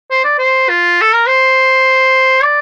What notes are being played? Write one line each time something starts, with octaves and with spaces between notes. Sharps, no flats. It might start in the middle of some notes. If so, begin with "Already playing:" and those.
C5
D5
C5
F4
A4
A#4
C5
D5